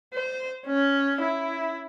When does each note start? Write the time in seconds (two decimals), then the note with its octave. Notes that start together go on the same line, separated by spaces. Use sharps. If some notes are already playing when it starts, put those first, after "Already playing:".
0.14 C5
0.67 C#4
1.22 E4